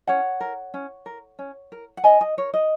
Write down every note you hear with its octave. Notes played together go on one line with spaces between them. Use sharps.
C#4 C#5 F#5
A#4
C#4
A#4
C#4
A#4
F#5
C#4 D#5 G#5
D#5
A#4 C#5
D#5